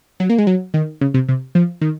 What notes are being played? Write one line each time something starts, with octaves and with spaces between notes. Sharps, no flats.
F#3
A#3
G#3
F#3
D#3
C#3
C3
C3
F3
D#3